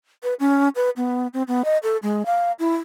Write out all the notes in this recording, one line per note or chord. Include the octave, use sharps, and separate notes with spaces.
B4
C#4
B4
B3
C4
B3
D#5
A4
G#3
F5
E4